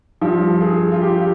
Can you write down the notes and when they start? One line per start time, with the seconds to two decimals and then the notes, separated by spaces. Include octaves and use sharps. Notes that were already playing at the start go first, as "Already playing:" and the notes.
0.21 G2 F3
0.61 G#4
0.92 F4
1.01 G4